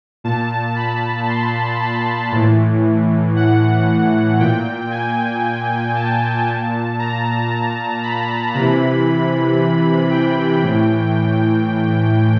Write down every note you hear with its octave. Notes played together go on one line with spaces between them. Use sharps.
A#2 A5
B5
C6
B5
A2 E3
F#5
A#2 G5
G#5
A5
A#2
A#5
B5
C3 E3 B5
G5
A2 E3